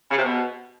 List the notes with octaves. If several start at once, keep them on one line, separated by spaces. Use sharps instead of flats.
C#3
C3
B2